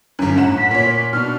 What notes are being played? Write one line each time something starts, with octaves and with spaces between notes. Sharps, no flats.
G1 F#2
A2 F#5 E7
B6
A#2 C#5
B2 D4 F6